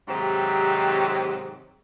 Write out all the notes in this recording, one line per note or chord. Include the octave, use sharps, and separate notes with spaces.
G#2 C3 D#3 F#3 C4 G4